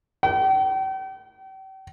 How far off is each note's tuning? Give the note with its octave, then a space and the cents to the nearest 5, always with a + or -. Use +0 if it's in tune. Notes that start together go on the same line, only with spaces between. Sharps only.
G5 -40